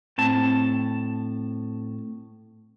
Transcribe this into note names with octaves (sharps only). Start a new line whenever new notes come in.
A2 C4 A5